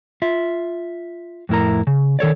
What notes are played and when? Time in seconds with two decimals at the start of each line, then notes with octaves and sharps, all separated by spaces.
0.22 F4 E5
1.49 F2 A2 E4 A#4 A#5
1.87 C#3
2.19 D#3 A4 C#5 D5